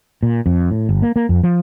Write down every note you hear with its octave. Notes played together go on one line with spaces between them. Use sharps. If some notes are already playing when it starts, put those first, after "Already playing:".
A#2
F2
A2
G1
A#3
A#3
F2
F3